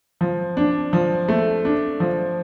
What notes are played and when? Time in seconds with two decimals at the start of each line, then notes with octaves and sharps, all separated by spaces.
0.21 F3
0.57 D4
0.93 F3
1.29 A3
1.65 D4
2.00 F3